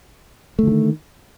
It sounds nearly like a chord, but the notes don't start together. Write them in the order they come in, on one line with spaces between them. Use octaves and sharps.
A3 D3 F3 D#3